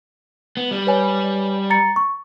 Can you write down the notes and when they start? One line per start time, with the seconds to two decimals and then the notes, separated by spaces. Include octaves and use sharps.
0.57 B3
0.71 G3
0.87 B4 C#5 G#5
1.70 A#5 A6 C#7
1.96 C#6